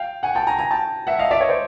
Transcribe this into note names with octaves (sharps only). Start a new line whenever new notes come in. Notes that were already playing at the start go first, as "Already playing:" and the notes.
Already playing: F5 G5
F#5 G#5
G5 A5
G#5 A#5
G#5 A#5
G5 A5
E5 F#5
D#5 F5
D5 E5
C#5 D#5
C5 D5